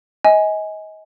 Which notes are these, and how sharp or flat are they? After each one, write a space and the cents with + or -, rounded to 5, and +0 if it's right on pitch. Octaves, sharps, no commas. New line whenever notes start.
D#5 +30 G#5 +0